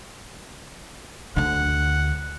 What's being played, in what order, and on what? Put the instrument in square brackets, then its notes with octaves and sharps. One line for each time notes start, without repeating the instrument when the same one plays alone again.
[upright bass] D2 D3 [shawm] F#5